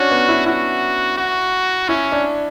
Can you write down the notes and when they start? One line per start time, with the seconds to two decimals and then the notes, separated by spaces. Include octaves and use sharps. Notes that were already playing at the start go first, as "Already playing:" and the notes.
Already playing: C#4 D4 F#4
0.11 B3
0.29 E4
0.46 E4 F#4
1.18 F#4
1.89 C#4 E4
2.12 D4